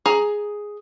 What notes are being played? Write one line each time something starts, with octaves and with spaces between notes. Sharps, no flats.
G#4 A#5